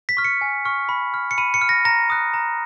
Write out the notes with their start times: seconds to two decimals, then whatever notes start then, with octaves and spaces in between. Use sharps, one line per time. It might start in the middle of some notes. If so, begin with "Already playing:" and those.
0.09 B6
0.17 C#6 F6
0.24 C#7
0.41 G#5
0.65 C#6 F6
0.89 B5
1.14 F6
1.31 C#7
1.38 B5 D#7
1.54 C#7
1.61 F6
1.69 A#6
1.85 A#5 A#6
2.10 D#6 F#6
2.34 A#5